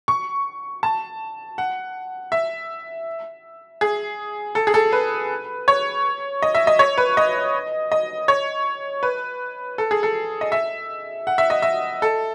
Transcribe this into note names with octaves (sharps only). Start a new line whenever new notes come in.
C#6
A5
F#5
E5
G#4
A4
G#4
A4
B4
C#5
D#5
E5
D#5
C#5
B4
D#5
D#5
C#5
B4
A4
G#4
A4
D#5
E5
F#5
E5
D#5
E5
A4